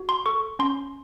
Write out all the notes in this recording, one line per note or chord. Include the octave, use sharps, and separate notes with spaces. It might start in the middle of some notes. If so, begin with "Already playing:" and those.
Already playing: F#4
C6
A4 C#6
C#4 C6